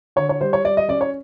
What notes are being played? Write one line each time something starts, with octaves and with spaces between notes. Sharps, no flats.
D3 C#5
C#5
G3 C5
C#5
G3 D5
D#5
C#4 D5
C#5